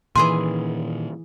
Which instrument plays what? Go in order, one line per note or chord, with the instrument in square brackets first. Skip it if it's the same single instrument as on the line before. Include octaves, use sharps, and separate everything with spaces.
[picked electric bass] A#2 D#3 [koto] E3 G#4 G#5 [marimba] C6